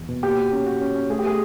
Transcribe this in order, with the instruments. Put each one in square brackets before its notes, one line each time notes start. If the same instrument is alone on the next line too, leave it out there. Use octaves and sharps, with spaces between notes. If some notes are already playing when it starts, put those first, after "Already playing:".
Already playing: [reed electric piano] E2
B2
[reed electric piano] A#3 [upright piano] G4
[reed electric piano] F#4
C#4
F#4
C#4
C#4
[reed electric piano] A3 [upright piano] G#4
[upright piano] G4
[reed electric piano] A3 [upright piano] G#4